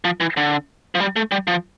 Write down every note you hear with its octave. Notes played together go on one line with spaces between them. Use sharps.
F3
E3
D3
F3
G3
A3
G3
F3